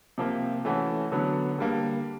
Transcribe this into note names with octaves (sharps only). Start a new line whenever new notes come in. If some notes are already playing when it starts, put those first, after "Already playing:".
C3 F3 A#3
E3 A3 C#4 F#4
D3 F#3 B3
D3 G3 A#3